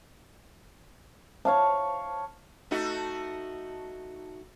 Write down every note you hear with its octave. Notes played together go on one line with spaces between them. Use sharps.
C#5 F5 A5
A3 D#4 F#4